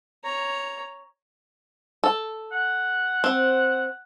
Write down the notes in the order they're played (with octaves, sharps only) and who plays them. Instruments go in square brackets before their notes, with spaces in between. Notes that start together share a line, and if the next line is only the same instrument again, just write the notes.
[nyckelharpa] C#5 A#5
[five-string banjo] A4
[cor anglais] F#5
[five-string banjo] C4